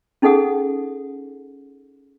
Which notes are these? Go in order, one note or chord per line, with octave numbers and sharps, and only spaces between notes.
C#4 D#4 G#4 A4 F#5 D#6